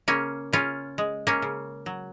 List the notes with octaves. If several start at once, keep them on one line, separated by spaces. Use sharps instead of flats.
C#3 A#3 C#4
C#3 C#4 F4
G#3
A#3 C#4
C#3
F#3